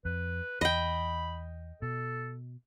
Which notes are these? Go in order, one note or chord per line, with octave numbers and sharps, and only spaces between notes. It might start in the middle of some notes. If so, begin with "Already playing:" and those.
F2 B4
E2 D#5 G5 B5
B2 A4